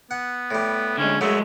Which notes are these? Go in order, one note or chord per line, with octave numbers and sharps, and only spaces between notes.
B3 F#5
A2 G3
D3 G#3 C#4
F#2 C#3 F#3 G#3 A3 E5